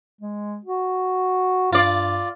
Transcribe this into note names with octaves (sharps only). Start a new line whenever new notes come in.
G#3
F#4
G2 F4 D5